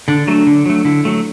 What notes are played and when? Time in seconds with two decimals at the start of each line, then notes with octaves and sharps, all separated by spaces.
0.08 D3 D4
0.28 F#3 A3
0.47 D3
0.66 F#3 A3
0.85 D3 E4
1.05 F#3 A3